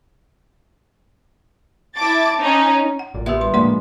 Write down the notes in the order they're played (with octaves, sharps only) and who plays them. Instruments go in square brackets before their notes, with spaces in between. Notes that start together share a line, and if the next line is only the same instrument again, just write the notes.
[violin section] E4 A5 D6 A6
C#4 D#4
[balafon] F#5
[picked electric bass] A1 [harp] F4 A#4 D5
[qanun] B3 [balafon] G4 E5 [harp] C6 G6
[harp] G2 D3 [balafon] E5 C6
[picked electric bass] A2 A#3 [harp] F3 G#3 D4 [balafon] D5 F#5 C6